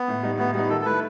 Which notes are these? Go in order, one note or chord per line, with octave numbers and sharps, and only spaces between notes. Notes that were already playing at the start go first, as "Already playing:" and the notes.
Already playing: B3
A2
G3 D#4
A2 B3
G3 B3 D#4
D#3 A4
A4
A3 E4 B4